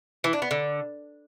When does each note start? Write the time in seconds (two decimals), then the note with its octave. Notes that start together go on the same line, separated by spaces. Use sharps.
0.24 E3
0.33 D4
0.42 B3
0.51 D3